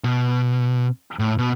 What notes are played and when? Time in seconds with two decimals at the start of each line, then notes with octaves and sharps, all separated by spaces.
0.04 B2
1.19 A2
1.38 B2